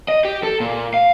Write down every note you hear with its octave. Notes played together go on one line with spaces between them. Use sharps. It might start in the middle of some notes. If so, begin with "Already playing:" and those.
D#5
G4
A4
A#2
F5